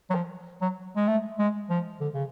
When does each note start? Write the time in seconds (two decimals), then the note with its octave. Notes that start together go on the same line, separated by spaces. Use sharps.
0.10 F#3
0.15 F3
0.61 F#3
0.96 G#3
1.08 A3
1.38 G#3
1.70 F3
2.00 D3
2.14 C#3